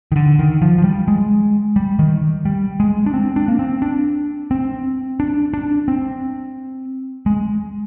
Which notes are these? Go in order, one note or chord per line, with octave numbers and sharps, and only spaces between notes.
D#3
D3
D#3
F3
F3
G3
G#3
G3
D#3
G3
G#3
D4
C4
D4
A#3
C4
D4
C4
D4
D4
C4
G#3